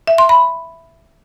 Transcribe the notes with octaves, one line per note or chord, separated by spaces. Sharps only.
E5
C6
B5